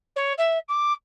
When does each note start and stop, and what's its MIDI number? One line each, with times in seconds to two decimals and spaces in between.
0.16 0.33 73
0.38 0.58 76
0.69 0.93 86